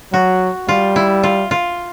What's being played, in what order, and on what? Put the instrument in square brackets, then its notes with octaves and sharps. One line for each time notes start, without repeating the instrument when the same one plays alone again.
[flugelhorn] F#3 [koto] F#4
[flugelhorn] G3 [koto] F4
[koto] E4
F4
F4